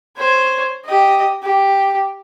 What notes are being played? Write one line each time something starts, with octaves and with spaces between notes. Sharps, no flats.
C5 C#5
G4 D#5
G4